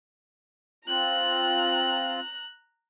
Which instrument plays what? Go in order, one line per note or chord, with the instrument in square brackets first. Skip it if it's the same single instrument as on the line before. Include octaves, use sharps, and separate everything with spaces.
[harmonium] C4 F4 [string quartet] A#5 F#6